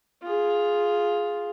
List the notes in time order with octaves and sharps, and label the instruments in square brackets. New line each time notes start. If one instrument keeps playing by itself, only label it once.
[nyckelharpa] F4 G#4